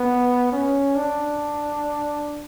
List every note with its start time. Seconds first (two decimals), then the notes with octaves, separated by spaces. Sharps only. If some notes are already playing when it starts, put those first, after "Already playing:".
Already playing: B3
0.52 C#4
0.95 D4